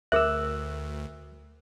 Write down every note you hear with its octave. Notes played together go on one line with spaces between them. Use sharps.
D2 G#4 A#4 E5 E6 F#6